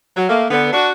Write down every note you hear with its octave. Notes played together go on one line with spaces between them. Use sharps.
F#3
A3 A#3
D3 B3
D4 F#4